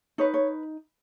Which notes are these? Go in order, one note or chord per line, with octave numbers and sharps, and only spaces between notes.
D#4 B4 C#5
C#5